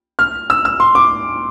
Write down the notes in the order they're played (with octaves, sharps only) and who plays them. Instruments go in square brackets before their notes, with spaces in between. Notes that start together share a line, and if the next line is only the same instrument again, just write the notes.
[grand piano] F6
E6
E6
C6
D6